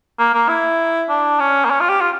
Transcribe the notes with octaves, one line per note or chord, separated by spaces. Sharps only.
A#3
A#3
E4
D4
C#4
A#3
C#4
F4
G4
F4